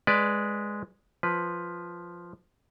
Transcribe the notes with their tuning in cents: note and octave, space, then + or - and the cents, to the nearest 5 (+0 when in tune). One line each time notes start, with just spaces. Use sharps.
G#3 +0 B4 +0 D5 +0
F3 +0 B4 +0